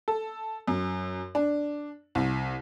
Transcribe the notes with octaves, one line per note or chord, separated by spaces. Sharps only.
A4
F#2
D4
C2